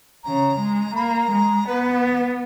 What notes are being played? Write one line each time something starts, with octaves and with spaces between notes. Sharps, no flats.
C#3 A#5
G#3
A#3 A#5 B5
G#3
B3 B4